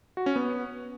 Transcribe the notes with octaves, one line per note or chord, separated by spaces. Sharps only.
F#4
C#4
B3